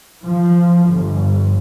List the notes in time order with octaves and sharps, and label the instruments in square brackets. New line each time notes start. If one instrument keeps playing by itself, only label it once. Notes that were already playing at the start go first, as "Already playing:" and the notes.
[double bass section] F3
G1